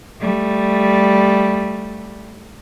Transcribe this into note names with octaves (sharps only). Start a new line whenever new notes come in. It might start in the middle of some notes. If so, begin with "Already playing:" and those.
G3 A3